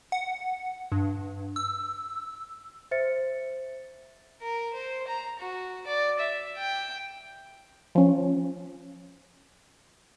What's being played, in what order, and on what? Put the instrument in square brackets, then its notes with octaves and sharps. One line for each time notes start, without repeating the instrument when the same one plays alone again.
[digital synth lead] F#5
G2
E6
[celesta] C5 E5 A6 C#7
[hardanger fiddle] A#4
C5
A#5
F#4
D5
E5
G5
[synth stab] F3 C#4